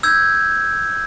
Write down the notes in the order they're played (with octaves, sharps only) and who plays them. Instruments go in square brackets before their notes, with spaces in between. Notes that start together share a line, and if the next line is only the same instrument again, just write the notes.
[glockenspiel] E6 G6 G#6